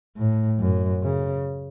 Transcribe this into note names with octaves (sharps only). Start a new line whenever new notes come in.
A2
F#2
C#3